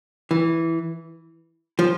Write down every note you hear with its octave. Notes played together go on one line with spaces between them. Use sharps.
E3
F3